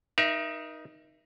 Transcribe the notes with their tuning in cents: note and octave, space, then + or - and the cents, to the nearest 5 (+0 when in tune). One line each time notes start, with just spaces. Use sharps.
D#4 +0 A#4 +35 E5 +25